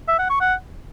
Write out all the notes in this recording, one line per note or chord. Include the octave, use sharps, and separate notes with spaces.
E5
F#5
C#6
F#5